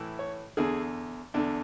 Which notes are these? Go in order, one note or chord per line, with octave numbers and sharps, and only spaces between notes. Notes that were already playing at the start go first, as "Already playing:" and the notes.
Already playing: A2 E3
C#5
E2 D3 G#4
E2 D3 D4